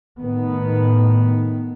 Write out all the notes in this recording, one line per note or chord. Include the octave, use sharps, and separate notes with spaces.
A2 D#3 B3